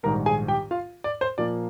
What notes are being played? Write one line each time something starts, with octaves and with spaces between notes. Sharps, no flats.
A#1 G#2 D#3 G3 A#4 A#5
G#4 G#5
G4 G5
F4 F5
D5
C5
A#2 F3 A#3 D5